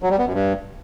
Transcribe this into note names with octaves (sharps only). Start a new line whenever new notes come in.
F#3
G3
B3
F#2
G2